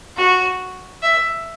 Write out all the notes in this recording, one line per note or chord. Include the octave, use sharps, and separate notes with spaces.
F#4
E5